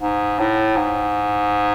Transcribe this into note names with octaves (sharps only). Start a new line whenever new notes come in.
G#2
A2
G#2